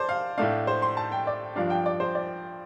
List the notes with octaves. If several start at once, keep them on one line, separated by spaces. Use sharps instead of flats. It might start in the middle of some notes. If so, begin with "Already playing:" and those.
Already playing: C5 D5 A5
F5
A2 A3 D4 F5
C5
C6
A5
G5
D5
G2 F3 D4 F5
G5
D5
C5
D5